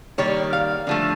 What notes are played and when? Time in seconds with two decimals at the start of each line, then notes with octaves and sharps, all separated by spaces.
0.18 D#3 G3 A#3 C#5
0.53 F5
0.87 D3 F3 A3